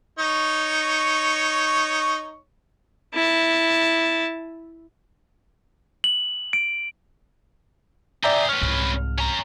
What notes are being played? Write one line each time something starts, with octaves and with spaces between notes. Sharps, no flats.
D#4 C#5 C#6
E4 A5
F#7
D7
G#4 D5 E5 G5 A#5
C#4 B4 F6
C2 G#2
C#4 A#5